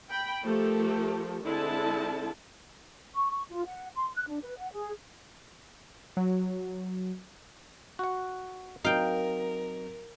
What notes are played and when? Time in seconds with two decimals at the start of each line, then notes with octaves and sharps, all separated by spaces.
0.10 G5 B5
0.44 F3 A3 G4 A4 A#4
1.45 D3 G#3 C4 E4 A4 A5
3.15 C#6
3.31 C#6
3.50 F4
3.66 F#5
3.95 C6
4.16 F#6
4.28 D4
4.44 B4
4.57 F#5
4.72 G#4
6.17 F#3
7.99 F#4 F#5
8.85 F#3 C4 D#4 F#4 A#4 F5 G5